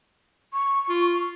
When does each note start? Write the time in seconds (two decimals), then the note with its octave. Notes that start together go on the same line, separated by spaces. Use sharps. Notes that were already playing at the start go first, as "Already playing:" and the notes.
0.53 C#6
0.89 F4